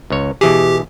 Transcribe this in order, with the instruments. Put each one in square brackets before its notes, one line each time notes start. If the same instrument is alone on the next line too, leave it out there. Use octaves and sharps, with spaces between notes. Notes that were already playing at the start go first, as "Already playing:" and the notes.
[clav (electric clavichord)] C#2 C#5
[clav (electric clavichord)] B2 E3 G#4 [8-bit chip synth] G4